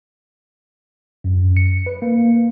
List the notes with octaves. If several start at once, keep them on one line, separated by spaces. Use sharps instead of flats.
F#2
C#7
B4
A#3